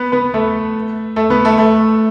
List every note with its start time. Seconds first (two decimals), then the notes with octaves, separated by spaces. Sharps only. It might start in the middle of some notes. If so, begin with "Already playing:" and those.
Already playing: B3 B4
0.12 B3 B4
0.34 A3 A4
1.16 A3 A4
1.30 B3 B4
1.45 A3 A4
1.58 A3 A4